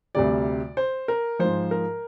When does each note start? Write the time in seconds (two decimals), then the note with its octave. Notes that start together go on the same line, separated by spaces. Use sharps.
0.15 D2 C3 G3 D5
0.77 C5
1.08 A#4
1.39 G#2 F3 C5
1.71 A#4